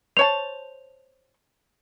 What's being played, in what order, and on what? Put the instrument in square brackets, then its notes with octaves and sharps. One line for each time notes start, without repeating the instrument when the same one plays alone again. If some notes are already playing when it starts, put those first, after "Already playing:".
[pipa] C5 C#5 A5 [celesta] F7